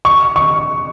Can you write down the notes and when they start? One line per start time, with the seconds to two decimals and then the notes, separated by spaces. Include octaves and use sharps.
0.05 C#6
0.36 C#6